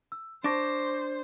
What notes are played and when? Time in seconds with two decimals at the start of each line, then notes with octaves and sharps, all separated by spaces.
0.12 E6
0.44 D4 C5 C#6 D6 A#6